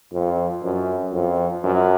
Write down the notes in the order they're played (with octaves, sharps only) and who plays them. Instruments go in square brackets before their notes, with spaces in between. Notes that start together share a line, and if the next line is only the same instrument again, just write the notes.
[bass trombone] F2
F#2
F2
F#2